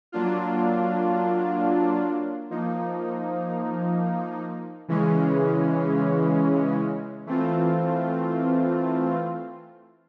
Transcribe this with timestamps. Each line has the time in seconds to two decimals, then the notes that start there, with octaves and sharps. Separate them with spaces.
0.12 F#3 A#3 D4 F4
2.50 F3 A#3 D#4
4.88 C#3 E3 G#3 C#4
7.26 E3 A3 C4 F4